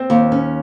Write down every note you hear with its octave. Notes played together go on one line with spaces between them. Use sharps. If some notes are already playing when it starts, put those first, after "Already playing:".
Already playing: C4
D#2
C#4